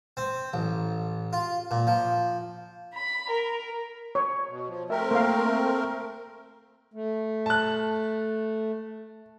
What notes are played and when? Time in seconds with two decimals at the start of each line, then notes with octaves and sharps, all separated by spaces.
0.17 C4
0.53 A1
1.33 F4
1.71 A#2
1.87 F3
2.93 B5
3.29 A#4
4.15 C#5
4.49 B2
4.69 F3
4.90 A3 C4 A#4 E5
5.11 A#3 F5
6.93 A3
7.46 A5 F#6